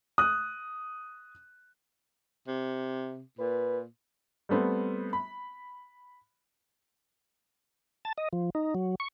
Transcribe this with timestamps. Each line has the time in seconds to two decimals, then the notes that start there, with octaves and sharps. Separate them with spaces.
0.18 D#6 F#6
2.48 C3
3.39 A#2 B4
4.49 G3 A3 B3 C4
5.13 B5
8.05 A5
8.18 D#5
8.33 F3
8.55 D#4
8.75 F#3
9.00 C#6